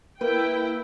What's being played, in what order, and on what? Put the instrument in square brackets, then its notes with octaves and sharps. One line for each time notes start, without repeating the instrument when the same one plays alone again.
[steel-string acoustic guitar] A#3 B4 [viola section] E4 G5